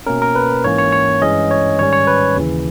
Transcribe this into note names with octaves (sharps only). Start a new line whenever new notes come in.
B2 A#3 C#4 A#4
A#4
B4
G#2 E3 A#3 C#4 C#5
C#5
C#5
G2 E3 G#3 C#4 D#5
C#5
G#2 D#3 G3 C#4 C#5
C#5
B4
D#2 C#3 E3